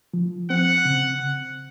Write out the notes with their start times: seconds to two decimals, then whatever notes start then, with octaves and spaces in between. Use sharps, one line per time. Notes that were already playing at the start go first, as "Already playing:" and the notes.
0.14 F3
0.50 C4 F#5
0.85 C#3